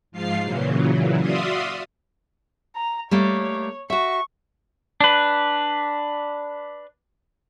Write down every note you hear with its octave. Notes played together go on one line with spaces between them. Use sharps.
G#2 F3 F4 F5 C7
A#2 C#3 E3 F#3
F#4 D5 E5 F5 C6 D#6
A#5
G3 A3 A#3 C#5
F#4 E5 C#6
D4 B4